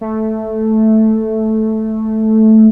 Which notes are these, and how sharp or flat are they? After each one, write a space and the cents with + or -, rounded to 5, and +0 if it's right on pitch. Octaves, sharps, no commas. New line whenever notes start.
A3 -5